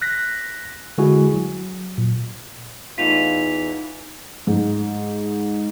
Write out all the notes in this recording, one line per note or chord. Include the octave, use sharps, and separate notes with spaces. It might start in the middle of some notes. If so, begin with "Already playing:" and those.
F#6 A#6 B6
D3 G#3 E4 F#4 G#4 G#5
F#3
A#2
E2 E3 A3 D#4 F4 B6 F7
G#2